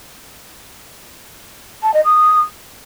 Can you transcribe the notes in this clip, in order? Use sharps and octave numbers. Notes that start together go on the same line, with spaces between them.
A5
D#5
D#6